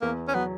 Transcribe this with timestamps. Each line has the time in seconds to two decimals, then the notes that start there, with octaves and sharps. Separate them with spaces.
0.02 E2 A#3
0.28 C#4
0.34 F#3 B3